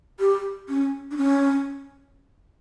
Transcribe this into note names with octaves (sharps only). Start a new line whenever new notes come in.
G4
C#4
D4
C#4